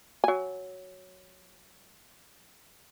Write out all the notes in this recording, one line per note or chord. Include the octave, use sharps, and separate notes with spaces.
F#3 G#5